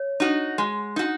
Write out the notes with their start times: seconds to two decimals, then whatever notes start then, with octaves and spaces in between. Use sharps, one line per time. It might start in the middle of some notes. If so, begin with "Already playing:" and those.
Already playing: C#5
0.20 D#4 F#4
0.58 G#3
0.96 D#4 F#4